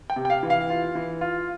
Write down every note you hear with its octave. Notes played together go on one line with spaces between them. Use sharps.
G5
C3
G5
F5
E3
F5
F4
E3
F4